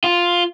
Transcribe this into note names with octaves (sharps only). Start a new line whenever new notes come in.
F4